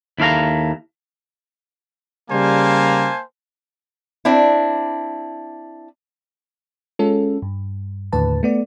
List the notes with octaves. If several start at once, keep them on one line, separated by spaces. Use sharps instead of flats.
D#2 E4 A4 F5 A#5
C#3 G3 A#3 C5 G#5 A5
C4 D4 E4
G#3 C#4 F4 A4
G2
D#2 A2 D3 B4 A5
A3 B3 D5